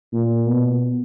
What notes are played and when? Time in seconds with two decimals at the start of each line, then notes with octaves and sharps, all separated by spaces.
0.13 A#2
0.49 B2